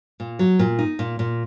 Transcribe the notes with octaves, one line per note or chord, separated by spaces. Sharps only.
A#2
F#3
A#2
D#4
A#2
A#2